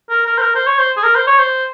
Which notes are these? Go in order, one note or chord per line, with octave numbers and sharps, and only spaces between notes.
A#4
A#4
C5
A#4
C5
C#5
C5
G#4
A#4
C5
C#5
C5